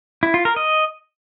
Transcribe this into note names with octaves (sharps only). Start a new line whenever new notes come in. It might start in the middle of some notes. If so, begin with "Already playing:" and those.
E4
F4
A#4
D#5